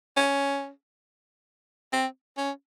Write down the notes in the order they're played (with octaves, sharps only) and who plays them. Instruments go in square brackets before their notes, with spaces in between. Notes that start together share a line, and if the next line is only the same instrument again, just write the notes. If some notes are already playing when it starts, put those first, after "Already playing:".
[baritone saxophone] C#4
C4
C#4